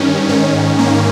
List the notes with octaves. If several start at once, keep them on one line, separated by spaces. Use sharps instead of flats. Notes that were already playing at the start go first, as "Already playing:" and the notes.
Already playing: G2 D#3 C#4
G#2 D#3 C#4
A#3